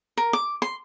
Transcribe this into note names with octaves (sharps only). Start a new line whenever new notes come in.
A#4
D6
C6